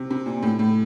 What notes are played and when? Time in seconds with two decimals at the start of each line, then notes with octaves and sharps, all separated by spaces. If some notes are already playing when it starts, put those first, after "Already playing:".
Already playing: C3
0.11 C3
0.26 A#2
0.43 A2
0.59 A2